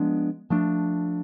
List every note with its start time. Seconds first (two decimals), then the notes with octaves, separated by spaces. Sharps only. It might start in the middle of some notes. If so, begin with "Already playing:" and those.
Already playing: F3 G#3 B3 D4
0.50 F3 A3 D4